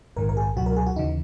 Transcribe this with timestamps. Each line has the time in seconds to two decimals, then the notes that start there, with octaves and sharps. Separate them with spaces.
0.16 A#1 G#2 D#3 A#4
0.29 A#4
0.37 G#4
0.56 C#2 B2 F#3 F#4
0.66 A#4
0.76 G#4
0.86 F#4
0.96 D#2 C#3 E3 D#4